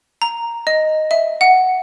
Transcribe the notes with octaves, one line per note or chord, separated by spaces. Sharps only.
A#5
D#5
E5
F#5